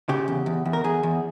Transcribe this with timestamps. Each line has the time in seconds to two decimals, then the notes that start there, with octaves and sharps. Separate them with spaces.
0.09 C#3 G4
0.28 E2
0.46 E2
0.65 E2
0.73 A#4
0.84 E2 G#4
1.03 E2